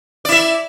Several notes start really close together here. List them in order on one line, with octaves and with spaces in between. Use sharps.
D5 E4 E5